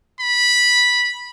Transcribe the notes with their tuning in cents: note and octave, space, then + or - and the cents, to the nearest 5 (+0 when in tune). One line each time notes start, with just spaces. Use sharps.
B5 -10